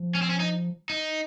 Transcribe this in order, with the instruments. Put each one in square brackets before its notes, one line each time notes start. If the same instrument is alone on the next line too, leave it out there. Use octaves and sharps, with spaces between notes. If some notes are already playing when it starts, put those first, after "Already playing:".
Already playing: [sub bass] F3
[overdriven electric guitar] C#4
C4
C#4
D#4
D#4